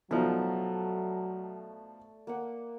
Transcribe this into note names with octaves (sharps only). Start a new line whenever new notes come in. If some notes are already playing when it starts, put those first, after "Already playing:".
B2 F3 F#3 A3 D#4 A4 D5
A#3 F#5